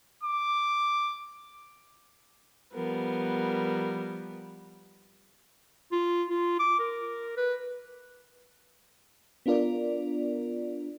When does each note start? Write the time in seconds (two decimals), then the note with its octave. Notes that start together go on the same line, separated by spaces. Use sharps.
0.23 D6
2.74 F3 G3 B3 A#4
5.92 F4
6.30 F4
6.60 D6
6.80 A#4
7.37 B4
9.46 B3 D4 F4 A#4 D5